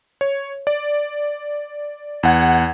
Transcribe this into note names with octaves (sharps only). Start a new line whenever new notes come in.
C#5
D5
E2 F#5 G#6